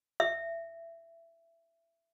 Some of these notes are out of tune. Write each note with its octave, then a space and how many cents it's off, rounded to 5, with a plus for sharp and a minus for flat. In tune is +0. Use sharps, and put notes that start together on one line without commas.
E5 +20